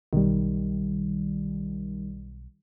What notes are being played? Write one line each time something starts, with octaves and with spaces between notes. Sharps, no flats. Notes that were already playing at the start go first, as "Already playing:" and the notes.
B1 D#3 G3